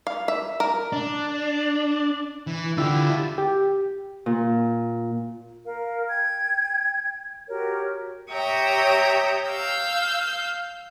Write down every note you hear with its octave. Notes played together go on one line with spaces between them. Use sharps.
F5
E5
A#4
D4
E3
D3 E4 F4 G4
G4
A#2
A#4 F5
G5 G#6
F#4 G4 A#4 C#5
G4 C#5 E5 G5 A#5 D#6
F5 E6 G6